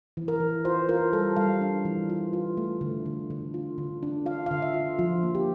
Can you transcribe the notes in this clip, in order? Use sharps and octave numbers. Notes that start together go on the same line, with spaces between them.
E3
A#4
E3
F4 C5
F4 A#4
G3 A4
G3 F5
D4
E3
F4
F4
A3
D3
D3
D3
F4
D3
D4
F4 F5
F5
D3
E5
F4
F3 F4
A#3
G4